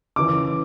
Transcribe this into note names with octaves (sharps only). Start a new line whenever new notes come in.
C#3 E3 D6